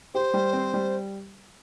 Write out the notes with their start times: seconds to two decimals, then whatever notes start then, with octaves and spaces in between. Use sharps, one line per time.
0.14 G4 C5
0.34 G3
0.53 C4
0.74 G3